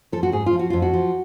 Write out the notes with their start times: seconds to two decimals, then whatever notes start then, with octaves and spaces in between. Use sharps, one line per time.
0.12 F3 A4
0.23 F#4
0.32 G#2 G#4
0.46 F4
0.53 F3
0.59 F#4
0.70 F2 F4
0.82 F#4
0.93 F3